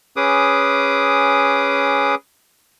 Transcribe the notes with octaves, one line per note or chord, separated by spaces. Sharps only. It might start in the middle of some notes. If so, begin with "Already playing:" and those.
C#4 G#4 B4 D6 D#6